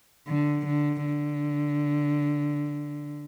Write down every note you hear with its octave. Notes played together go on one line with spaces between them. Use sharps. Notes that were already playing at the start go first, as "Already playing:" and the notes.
D3
D3
D3